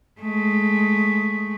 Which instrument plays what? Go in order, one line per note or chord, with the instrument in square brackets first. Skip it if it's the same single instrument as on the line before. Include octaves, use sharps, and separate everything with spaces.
[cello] G#3 A3